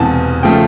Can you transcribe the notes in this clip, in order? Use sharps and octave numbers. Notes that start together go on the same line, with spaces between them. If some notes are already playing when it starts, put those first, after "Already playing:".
Already playing: E1 E2 C3 G#5 A5
C#3 F3 A3 G5